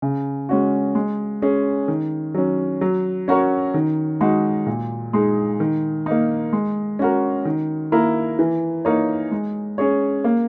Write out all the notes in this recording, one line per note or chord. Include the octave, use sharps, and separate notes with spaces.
C#3
G#3 C#4 F#4
G#3
C#4 G#4
D#3
F#3 C#4
F#3
C#4 F#4 A#4 C#5
D#3
G#3 D#4 F#4
A#2
G#3 D#4 G#4
D#3
A#3 D#4
G#3
C#4 F#4 A#4
D#3
A#3 E4 A#4
E3
A#3 D#4 A#4 C#5
G#3
C#4 G#4 C#5
A#3